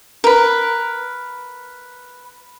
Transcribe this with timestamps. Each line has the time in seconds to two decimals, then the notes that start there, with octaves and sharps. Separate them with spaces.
0.24 A#4 B4